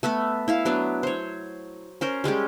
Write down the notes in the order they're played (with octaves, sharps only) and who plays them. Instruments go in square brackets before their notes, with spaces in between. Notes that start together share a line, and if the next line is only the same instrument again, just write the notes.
[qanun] A3 B3 E5 B5
E4 E5 F5
F#3 B3 D4
C5 C#5
C#4 A#4 C5
G3 G#3 C#4 G4